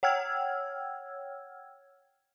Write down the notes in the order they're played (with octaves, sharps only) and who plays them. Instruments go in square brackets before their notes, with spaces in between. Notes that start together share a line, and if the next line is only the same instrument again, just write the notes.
[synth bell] C#5 F#5 G5 E6 F6 G#6